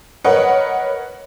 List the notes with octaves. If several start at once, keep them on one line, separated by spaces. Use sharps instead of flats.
A#4 B4 C#5 D#5 F#5